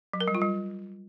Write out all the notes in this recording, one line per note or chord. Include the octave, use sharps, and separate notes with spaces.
F#3
A#4
G3
F4
G3